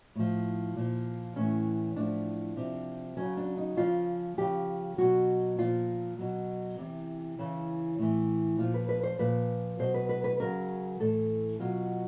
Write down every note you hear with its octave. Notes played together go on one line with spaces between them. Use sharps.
A2 F3
A#2 F3
A2 E3 C#4
A2 F3 D4
C3 F3
C#3 F#3 C#4
D4
D#4
C#3 F3 F4
C#3 F3 G4
B2 F#3 F#4
A#2 F3 F4
B2 F#3
C3 E3
C#3 E3
A2 E3
A#2 F3 F4
B4
B4
C5
A#2 F3 B4
B2 F#3 C5
B4
B4
B4
C#3 F#3 A#4
A2 E3 A4
B2 F#3 F4